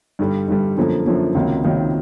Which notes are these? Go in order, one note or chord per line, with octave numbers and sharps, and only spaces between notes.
G2 D3 G3
G2 D3 G3
F#2 D3 F3 A#3
F#2 D3 F3 A#3
C#2 C3 D#3 F#3 A#3
C#2 C3 D#3 F#3 A#3